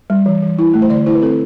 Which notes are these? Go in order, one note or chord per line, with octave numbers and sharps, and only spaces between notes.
G3
E3
E3
E4
A3
C5
D3 D5
E4 C5
B4
C4 A4